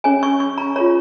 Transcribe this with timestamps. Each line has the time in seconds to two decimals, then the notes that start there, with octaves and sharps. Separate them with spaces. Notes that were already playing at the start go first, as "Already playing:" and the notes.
0.04 C#4 G#4 C#5 G#5
0.23 C#6
0.40 C#6
0.58 A#5
0.76 F4 G#4 C#5 A#5